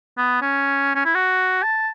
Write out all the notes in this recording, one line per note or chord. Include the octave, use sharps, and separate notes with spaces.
B3
C#4
C#4
E4
F#4
A5